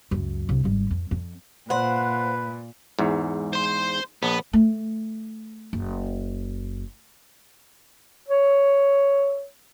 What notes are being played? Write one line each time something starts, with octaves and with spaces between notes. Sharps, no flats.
C#2 F#2
C2 G2
G#1 G3
F2
F2
A#2 B4 C5 F#5
E2 G#2
C5 C6
A#1 B3
A3
F#1
C#5